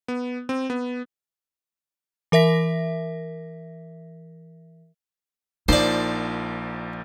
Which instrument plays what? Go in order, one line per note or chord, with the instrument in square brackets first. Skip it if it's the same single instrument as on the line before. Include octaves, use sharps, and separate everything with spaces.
[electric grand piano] B3
C4
B3
[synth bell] E3 A#4 E5 A#6 B6
[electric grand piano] A#1 F3 A#3 [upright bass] D#4 [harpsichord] C5 D5